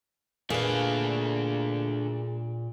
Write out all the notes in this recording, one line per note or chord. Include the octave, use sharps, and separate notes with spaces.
A#2 A3 A#3 D4 G#4 B4